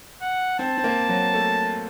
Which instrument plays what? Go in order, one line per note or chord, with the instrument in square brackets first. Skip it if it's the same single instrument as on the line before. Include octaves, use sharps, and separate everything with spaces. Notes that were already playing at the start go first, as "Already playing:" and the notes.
[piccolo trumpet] F#5
[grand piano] C4 [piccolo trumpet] A5
[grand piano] C4
A#3
F#3
A3